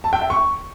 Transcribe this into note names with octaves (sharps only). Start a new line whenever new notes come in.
A5
G5
E5
C#6